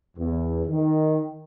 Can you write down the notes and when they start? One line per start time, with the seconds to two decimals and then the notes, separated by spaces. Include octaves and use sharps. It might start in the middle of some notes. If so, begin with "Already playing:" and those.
0.17 E2
0.66 D#3